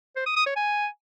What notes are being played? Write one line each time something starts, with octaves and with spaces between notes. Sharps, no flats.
C5
D#6
D#6
C#5
G#5